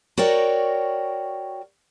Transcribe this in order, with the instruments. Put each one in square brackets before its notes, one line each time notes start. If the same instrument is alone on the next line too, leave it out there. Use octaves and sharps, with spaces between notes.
[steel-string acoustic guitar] F#4 A#4 C#5 D5 G5